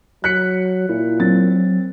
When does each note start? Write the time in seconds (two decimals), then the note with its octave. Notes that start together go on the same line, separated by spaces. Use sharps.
0.24 F#3 F#6 B6 C#7
0.89 A#2 E4
1.20 F#3 C4 A6